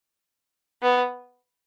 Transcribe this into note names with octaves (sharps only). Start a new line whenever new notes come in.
B3